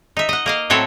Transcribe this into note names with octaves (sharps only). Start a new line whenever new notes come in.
D#4 E5
D#5 F#5
A#3 D#5 F5
A2 F#3 C4 A4 C#5